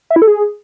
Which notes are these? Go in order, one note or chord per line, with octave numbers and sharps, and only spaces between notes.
E5
E4
A4
G#4